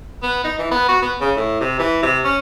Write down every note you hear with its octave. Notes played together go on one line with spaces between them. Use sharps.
B3
D#4
E3
B3
F#4
B3
C#3
A2
C3
E3
C3
C#4